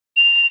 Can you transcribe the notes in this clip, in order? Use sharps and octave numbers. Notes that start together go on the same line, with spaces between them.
F7